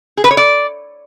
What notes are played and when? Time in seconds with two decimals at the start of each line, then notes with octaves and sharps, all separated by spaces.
0.17 G#4
0.24 B4
0.31 C#5
0.37 D5